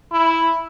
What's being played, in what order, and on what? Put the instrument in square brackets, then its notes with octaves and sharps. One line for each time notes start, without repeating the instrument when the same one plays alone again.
[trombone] E4